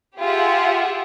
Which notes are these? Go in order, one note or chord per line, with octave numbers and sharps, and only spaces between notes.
F4 G4 G#4 E5 F#5